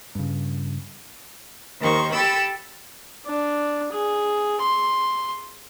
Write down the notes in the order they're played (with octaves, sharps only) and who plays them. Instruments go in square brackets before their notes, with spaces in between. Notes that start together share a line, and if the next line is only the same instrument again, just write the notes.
[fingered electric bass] G2 C#3
[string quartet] D#2 D#3 C5 C#6
G4 A4 G5 B5 E6
[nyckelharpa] D4
G#4
C6